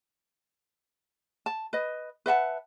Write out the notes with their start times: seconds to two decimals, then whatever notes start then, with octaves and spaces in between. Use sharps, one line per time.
1.46 A5
1.73 B4 D#5
2.26 B4 E5 F#5 A5